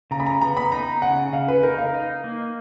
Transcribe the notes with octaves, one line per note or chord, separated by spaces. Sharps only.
C#3 A#5
B5
A#5
B3 A#5
B5
D#4 A#5
C#3 F#5
C#3 F5
B4
D#4 A#4
F5
D#4
A#3